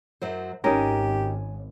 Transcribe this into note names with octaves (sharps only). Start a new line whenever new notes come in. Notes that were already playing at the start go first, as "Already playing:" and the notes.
F#2 F#3 C5
G#1 C#4 D#4 G4 A#4